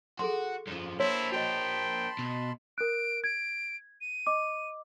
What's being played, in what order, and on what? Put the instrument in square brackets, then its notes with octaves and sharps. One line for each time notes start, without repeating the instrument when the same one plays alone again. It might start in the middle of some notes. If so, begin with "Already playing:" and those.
[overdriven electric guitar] F#4 [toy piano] G#4 A4 C6
[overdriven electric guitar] F#2 F3
[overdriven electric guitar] A#3 C5 [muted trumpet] E4 [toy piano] C#5 [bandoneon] A5 B5 C6
[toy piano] F#4 D#5 [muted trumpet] G5
[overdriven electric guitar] B2
[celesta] A#4 F#6 [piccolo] D7
[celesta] G#6 [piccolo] D7
[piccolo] D#7
[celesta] D#5 D6